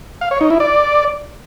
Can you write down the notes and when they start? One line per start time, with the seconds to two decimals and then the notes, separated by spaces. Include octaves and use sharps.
0.21 F5
0.31 C#5
0.41 D#4
0.50 E4
0.60 D5